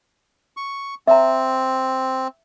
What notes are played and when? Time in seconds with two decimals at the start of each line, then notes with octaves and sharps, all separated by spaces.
0.57 C#6
1.08 C4 E5 A#5